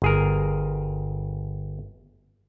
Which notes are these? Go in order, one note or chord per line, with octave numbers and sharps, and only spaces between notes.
G1 G#4 A#4